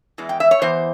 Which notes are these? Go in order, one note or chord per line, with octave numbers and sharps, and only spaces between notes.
E2 E3 G#3
G5
E5
C#5
E2 E3 C5